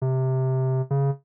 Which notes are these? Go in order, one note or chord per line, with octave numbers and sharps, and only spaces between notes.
C3
C#3